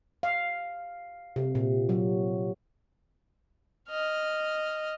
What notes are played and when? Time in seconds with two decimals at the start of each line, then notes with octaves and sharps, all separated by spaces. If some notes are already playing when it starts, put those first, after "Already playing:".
0.23 F5
1.36 C3
1.55 A#2
1.89 F#3
3.90 D#5 F6